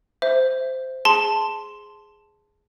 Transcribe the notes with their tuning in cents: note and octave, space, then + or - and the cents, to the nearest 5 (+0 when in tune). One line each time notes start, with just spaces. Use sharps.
C5 -10 E5 +0
G#4 +0 A5 +0 C6 -5